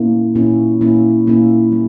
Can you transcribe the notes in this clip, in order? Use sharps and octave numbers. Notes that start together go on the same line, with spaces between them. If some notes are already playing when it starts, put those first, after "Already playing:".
Already playing: A#2 A#3 C#4 E4
A#2 A#3 C#4 E4
A#2 A#3 C#4 E4
A#2 A#3 C#4 E4
G3